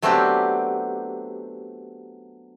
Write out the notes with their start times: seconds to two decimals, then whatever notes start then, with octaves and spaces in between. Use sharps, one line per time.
0.02 F#3 A3 B3 C4 D4 G4